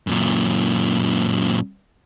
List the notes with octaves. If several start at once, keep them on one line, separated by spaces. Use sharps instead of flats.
F#2 A#2